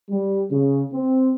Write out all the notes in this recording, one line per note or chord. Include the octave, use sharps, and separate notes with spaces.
G3
C#3
C4